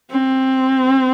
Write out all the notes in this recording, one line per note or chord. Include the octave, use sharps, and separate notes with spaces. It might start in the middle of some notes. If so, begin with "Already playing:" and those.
C4